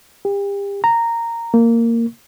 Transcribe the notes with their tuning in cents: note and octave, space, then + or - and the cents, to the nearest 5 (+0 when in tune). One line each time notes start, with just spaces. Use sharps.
G4 +35
A#5 -10
A#3 -15